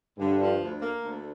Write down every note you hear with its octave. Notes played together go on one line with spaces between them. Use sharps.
G2 D3
F3
D2
A#3
D2